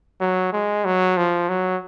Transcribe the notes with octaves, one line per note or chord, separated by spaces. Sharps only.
F#3
G#3
F#3
F3
F#3